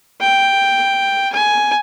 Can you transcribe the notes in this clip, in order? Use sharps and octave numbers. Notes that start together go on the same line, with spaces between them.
G5
G#5